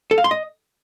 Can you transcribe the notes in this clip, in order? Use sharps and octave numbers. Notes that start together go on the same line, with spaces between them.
A4
F5
C6
D#5